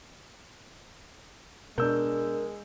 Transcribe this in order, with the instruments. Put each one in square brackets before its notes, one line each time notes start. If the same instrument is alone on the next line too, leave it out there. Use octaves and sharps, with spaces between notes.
[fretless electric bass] B2 [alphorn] G#3 [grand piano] D4 E6 G6 [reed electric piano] A#4